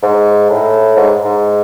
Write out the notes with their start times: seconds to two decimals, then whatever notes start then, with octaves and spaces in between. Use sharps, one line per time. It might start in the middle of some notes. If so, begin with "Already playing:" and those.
0.03 G#2
0.50 A2
0.97 G#2
1.24 G#2